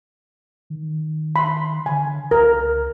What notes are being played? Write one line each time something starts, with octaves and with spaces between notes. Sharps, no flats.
D#3
B5 C6
D3 G#5
C#2 A#4